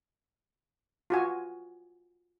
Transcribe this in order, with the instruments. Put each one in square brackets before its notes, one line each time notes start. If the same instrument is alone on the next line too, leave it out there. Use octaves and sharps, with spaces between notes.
[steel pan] F4 F#4 G#5